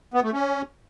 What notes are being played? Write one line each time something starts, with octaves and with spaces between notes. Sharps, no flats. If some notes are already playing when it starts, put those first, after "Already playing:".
B3
A3
C#4